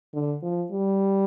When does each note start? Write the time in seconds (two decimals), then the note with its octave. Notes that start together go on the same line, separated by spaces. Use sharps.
0.14 D3
0.42 F3
0.71 G3